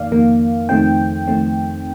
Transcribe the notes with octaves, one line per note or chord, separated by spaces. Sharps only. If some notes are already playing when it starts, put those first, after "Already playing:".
Already playing: F2 D#3 A#3 D5 F5
F2 D#3 A#3
F2 D#3 A3 C4 G5
F2 D#3 A3 C4